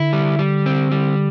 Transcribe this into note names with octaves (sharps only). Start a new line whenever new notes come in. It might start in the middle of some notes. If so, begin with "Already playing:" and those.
Already playing: D3 E4
G3
G3
C4
G3